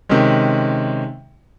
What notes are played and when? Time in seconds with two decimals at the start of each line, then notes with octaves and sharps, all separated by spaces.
0.09 C3 D#3 G#3 C#4